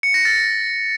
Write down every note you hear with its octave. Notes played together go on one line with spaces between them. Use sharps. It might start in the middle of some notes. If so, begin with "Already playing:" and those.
C#7
A#6
A6